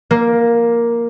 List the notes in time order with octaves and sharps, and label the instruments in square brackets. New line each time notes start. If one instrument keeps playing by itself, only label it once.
[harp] A#3